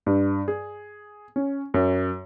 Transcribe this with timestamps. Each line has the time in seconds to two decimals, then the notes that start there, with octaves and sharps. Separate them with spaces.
0.06 G2
0.48 G#4
1.36 C#4
1.74 F#2